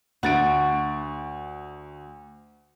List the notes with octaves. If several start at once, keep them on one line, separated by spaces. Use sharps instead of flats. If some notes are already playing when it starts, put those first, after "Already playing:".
D2 F#4 A6 D7